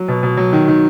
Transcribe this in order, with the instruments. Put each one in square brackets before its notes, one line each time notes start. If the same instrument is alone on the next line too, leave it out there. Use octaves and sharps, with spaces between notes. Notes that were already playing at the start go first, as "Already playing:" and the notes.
Already playing: [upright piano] F#3
B2
B2
F#3
D#3
D#3